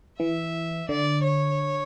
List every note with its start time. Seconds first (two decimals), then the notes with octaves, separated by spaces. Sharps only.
0.20 E3 E5
0.89 D3 D5
1.23 C#5